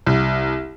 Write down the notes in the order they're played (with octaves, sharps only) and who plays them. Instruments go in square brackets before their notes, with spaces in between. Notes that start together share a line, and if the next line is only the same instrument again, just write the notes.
[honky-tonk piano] C2